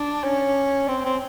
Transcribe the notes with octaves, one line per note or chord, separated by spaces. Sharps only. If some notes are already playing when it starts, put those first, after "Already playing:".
Already playing: D4
C#4
C4
C4